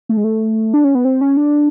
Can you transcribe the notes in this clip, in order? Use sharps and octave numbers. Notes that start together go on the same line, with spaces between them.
A3
G#3
A3
D4
C#4
B3
C4
C#4
D4